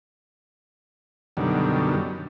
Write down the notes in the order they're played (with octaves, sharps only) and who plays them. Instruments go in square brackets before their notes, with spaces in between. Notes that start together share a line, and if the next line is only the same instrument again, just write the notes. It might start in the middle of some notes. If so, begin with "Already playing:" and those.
[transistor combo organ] F#2 B2 D3 D#3 G3